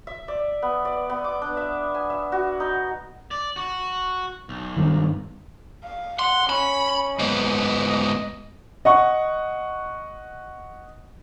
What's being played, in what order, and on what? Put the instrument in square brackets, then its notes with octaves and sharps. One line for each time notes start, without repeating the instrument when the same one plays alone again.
[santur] E5
D5
B3
D5
B3
D6
D4
E5
G#5
E5
F#4
D#4
[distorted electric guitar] D5
F#4
B1
[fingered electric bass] G2 D#3
[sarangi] F5
[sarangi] F#5 [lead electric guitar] C6
[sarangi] C#4 [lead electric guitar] B5
[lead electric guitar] G#2 B3 [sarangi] D#5
[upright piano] D#5 F#5 C#6